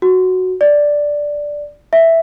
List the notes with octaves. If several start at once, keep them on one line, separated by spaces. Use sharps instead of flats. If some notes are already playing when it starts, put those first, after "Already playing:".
F#4
D5
E5